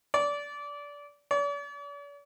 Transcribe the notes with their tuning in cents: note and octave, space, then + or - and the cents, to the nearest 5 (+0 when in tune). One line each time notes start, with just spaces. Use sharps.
D5 -20
D5 -45